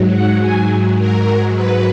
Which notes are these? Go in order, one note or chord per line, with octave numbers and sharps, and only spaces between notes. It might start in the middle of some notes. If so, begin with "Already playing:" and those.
Already playing: G#2 F#3
F#5
G#5
G#2 F#3 A#4
B4